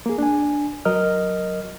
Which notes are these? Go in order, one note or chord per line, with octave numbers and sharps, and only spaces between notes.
A#3 G#4
D4 G#5
F#3 A#4 D#5 F6